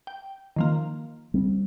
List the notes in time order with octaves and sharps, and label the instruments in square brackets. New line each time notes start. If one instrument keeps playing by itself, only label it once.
[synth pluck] G5
D#3 F3 A#3
[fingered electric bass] G3 C4